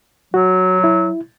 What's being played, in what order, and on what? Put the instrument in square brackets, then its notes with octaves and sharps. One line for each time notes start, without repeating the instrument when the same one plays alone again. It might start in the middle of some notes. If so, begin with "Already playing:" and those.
[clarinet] F#3 [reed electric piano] F#4
[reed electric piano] E4